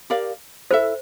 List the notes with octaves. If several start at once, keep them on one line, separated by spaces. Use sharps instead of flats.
G4 A#4 D5 F5
E4 A4 C5 E5